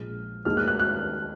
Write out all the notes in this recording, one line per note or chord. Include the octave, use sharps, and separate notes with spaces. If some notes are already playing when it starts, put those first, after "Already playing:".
Already playing: A#1 A#2 F3 G#3 F6
D#2 D#3 G#3 F6
F#6
F#6
F#6